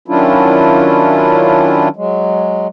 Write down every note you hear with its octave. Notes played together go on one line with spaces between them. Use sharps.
D#3 F#3 C#4 D4 E4 F4
F#3 G#3